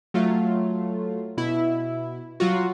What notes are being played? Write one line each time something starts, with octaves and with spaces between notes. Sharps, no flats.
F#3 A3 F4
B2 E4
F#3 F4 F#4